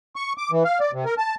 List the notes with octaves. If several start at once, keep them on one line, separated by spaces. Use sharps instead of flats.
C#6
D6
E3
F5
D5
C3
A#4
A5